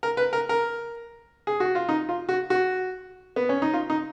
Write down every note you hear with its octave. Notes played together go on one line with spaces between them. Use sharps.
A#4
B4
A#4
A#4
G#4
F#4
F4
D#4
F4
F#4
F#4
B3
C#4
D#4
F4
D#4